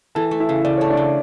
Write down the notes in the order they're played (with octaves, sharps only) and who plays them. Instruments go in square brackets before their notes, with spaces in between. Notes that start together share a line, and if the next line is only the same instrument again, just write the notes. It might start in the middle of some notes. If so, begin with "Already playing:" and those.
[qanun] E3 [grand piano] A4 A5
[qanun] A3
[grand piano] E4 E5
[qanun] C#3
[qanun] C#3 [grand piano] D5
[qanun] A3 [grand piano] C#5
[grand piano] D4 D5
[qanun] C#3